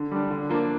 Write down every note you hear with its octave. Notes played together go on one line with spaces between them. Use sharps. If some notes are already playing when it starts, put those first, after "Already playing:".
Already playing: D3
G3 D4
D3
F3 A#3 D4